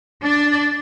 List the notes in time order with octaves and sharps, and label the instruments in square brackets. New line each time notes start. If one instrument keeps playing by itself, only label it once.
[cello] D4 D5